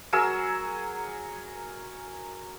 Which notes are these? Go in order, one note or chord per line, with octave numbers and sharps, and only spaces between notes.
F#3 G#4 A#4 E6